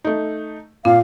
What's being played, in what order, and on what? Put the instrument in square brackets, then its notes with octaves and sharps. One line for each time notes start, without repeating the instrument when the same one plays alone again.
[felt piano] A3 D#4
[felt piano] A#2 [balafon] F4 [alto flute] F5